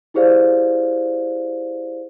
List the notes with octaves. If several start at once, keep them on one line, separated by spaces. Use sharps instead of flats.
E4 G4 G#4 C5 D5 F5